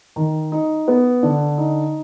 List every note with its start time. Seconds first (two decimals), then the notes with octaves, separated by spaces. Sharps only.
0.16 D#3
0.52 D#4
0.88 B3
1.23 D3
1.58 D#4